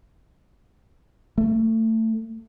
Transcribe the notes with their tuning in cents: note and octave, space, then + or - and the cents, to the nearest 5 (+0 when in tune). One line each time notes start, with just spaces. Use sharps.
A3 +25